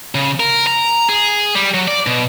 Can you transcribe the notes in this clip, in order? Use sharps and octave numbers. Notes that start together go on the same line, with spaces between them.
C#3
A#4
A#5
G#4
G3
F#3
D5
B2